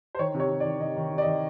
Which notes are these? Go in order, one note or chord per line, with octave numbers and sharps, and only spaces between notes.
C5
D#3 C#5
C3
C#5
C3
D5
D#3
C3 D#5
D#3
C3
D5
D#5
D#3